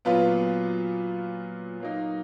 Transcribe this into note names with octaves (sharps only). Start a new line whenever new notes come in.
A#2 F#3 B3 F4 B4
F#3 A#3 D#4